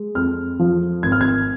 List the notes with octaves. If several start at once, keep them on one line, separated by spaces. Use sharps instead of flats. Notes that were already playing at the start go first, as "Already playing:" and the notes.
Already playing: G#3
F2 F6
F3
G#1 G#6
F6
G#6